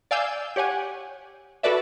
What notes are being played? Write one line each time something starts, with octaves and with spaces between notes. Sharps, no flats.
D5 F5 G#5 E6 G6
G4 C#5 F#5 G#5
F#4 A4 B4 D5 E5